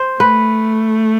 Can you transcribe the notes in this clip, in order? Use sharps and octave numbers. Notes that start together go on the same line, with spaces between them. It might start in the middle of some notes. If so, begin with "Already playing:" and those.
Already playing: C5
A3 B4